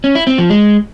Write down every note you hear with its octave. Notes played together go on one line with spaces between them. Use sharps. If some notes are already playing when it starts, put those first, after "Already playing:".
C#4
E4
C4
F3
G#3